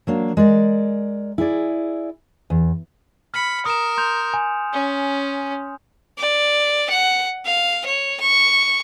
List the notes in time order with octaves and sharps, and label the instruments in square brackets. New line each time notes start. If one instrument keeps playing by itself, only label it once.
[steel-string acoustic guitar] F#3 A#3 D4
G#3 A#4 D5
E4 G#4 D5
E2
[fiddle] B5 [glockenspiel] F6 C#7
[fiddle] A#4 [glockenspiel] D#6 E7
[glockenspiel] C6 G6 F7
G#5
[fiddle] C#4
D5
F#5
F5
C#5
C#6